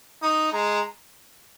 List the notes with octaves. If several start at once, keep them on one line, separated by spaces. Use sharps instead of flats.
D#4 D#6
G#3 A#5